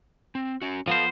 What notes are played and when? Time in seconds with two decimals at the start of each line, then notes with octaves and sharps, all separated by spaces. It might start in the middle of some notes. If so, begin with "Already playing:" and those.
0.35 C4
0.62 C#4 F#4
0.88 F3 B3 A4 C5 F5